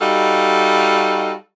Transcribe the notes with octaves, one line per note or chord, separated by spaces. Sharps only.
G3 D#4 F#4 A4 D#5 F5